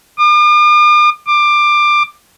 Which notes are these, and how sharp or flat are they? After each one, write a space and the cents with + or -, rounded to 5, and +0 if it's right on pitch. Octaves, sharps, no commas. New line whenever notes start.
D6 +45
D6 +20